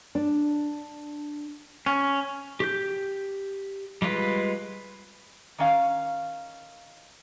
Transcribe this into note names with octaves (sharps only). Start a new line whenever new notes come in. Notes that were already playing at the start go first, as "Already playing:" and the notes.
D4
C#4
G4 G6
G3 G#3 F4 B4
D#3 C#4 F5